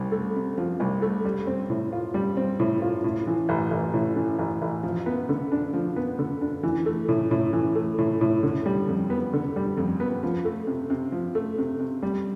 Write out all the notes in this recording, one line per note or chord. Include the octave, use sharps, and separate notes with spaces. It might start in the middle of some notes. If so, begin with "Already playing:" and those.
Already playing: C2
A3
C3
F3
C2
A3
G3
C4
A2
F4
G3
C4
A2
F4
A2
E3
A1
A1
A2
E3
A1
A1
F3
B3
D3
D4
F3
B3
D3
D4
E3
A3
A2
A2
E3
A3
A2
A2
D3
G3
F2
B3
D3
G3
F2
B3
F3
A3
C3
C3
F3
A3
C3
C3
G3